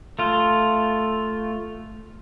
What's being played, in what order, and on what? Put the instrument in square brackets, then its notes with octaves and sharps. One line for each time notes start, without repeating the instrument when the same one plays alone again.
[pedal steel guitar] A3 F4